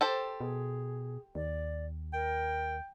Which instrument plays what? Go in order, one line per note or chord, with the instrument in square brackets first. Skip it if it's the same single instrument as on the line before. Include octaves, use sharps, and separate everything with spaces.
[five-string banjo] G4 A4 C5
[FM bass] B2 [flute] G#4
[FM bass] D#2 [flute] D5
[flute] A#4 [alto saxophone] G5